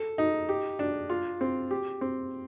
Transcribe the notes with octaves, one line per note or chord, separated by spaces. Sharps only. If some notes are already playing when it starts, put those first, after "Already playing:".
Already playing: A4
D#4
G4
D4
F4
C4
G4
C4